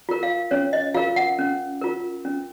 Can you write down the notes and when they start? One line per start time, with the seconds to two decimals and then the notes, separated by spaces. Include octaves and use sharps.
0.09 F4 A#4
0.23 F5
0.51 C#4 C#5
0.73 D#5
0.94 F4 A#4 F5
1.16 F#5
1.39 C#4
1.81 F4 A#4
2.25 C#4